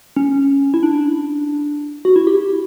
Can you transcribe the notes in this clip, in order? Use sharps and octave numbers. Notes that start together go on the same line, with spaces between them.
C#4
E4
D4
F#4
E4
G4